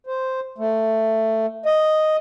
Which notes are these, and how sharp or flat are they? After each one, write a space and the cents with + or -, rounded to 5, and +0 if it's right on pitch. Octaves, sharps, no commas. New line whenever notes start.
C5 -5
A3 +10
D#5 +0